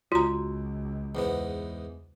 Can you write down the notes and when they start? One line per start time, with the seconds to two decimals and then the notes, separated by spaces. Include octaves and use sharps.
0.12 C#2 F4 F#4 A#5
1.15 E2 G#2 B3